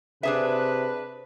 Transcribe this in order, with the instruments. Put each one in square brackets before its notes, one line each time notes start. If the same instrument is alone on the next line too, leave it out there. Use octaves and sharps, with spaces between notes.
[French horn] C3 [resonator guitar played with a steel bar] D4 G#4 E5 [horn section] B4